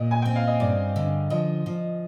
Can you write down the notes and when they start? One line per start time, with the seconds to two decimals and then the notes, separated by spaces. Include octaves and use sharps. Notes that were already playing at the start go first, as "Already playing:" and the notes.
Already playing: A#2 D#5
0.11 G#5
0.22 C4 G5
0.36 F5
0.47 D#5
0.60 G2 D5
0.96 D3
1.30 F3 D#5
1.66 F3